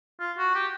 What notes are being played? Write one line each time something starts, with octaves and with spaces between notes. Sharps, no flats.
F4
F#4
G4